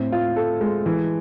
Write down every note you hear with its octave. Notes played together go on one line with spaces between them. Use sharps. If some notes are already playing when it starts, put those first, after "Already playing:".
Already playing: A2 C4
F4
A4
G#3
E3